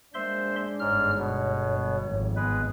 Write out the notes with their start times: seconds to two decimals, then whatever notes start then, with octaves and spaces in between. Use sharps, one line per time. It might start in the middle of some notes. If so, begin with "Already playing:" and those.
0.14 G#3 A#3 D4 C5 E5 C6
0.80 G1 G#2 C#5 F6
1.18 B2
2.05 G#1 F2
2.36 G#3 B3 B4